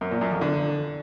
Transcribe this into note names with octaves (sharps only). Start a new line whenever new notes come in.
F#2
A#2
F#2
F2
D3